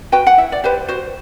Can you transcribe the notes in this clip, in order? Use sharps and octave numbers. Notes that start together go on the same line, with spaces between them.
F#4 B4 G5
F#5
E4 E5
D5
G4 B4 C5
F#4 C5